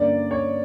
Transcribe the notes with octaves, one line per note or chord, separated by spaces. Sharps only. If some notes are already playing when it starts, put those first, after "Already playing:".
Already playing: G2 D3 A#3 C#4 D5
C#5